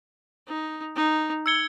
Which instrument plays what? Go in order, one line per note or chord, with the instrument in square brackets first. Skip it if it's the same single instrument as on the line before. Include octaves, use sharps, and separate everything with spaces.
[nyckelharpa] D#4
D#4
[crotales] E6 G#6 C#7 G7